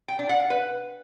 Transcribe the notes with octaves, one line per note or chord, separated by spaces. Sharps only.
G5
D4
F#5
F5
B4